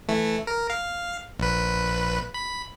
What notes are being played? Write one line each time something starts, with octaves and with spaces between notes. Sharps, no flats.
E3 A3
A#4
F5
A#1 B4
B5